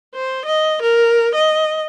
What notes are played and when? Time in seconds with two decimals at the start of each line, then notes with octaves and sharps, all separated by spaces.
0.15 C5
0.45 D#5
0.82 A#4
1.35 D#5